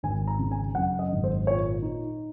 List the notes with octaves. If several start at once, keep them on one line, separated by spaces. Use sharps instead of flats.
G#1 G#5
A#5
C#3
G#5
F#2 F#5
D#5
G#1
C5
A#2 C#5
D#4